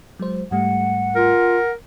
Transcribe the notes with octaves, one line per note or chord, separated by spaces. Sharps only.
F#3 G#3 C5
G#2 G3 A3 F#5
F4 A#4